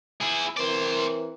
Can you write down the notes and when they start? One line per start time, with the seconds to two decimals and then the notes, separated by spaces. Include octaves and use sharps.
0.21 E4 G#4
0.57 E3 C4 A#4 C5 D5